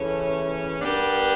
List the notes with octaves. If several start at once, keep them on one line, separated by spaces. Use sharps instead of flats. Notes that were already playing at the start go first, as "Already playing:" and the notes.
Already playing: C#3 E3 A3 C#4
G3 B3 D4 G4 A#4